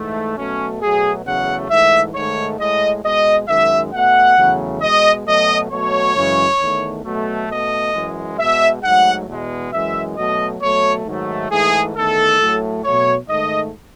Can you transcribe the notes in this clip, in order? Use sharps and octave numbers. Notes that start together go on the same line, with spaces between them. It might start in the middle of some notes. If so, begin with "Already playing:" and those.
Already playing: G#2 E3 A3
B2 F#3 A3 C#4
B2 F#3 A3 G#4
E2 C#3 F#3 A3 F#5
G#2 E3 A3 E5
G#2 D#3 A3 C#5
A2 G#3 D#5
B2 G#3 D#5
F#2 D#3 G#3 E5
B2 A3 F#5
E2 C#3 F#3 A3
B2 G#3 D#5
B2 F#3 A3 D#5
B2 F#3 A3 C#5
F#2 C#3 E3 G#3
E2 D#3 A3
B2 F#3 A3
B2 A3 D#5
F#2 E3 G#3
B2 G#3 E5
G#2 F#3 A3 F#5
E2 B2 G#3
F#2 E3 G#3 E5
B2 F#3 A3 D#5
B2 F#3 A3 C#5
G#2 D#3 F#3 A3
G#2 E3 A3 G#4
E2 D#3 A3 A4
A2 F#3 A3
B2 F#3 A3 C#5
G#2 D#3 A3 D#5